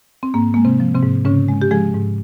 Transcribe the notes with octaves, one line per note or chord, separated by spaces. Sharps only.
C4
G#2 A#3
G#3 A#3
C3 C4
F3
C3 C4
G#2
G#2 C#3 C#4
G#3
G4
F3 G#3 G#4
G#2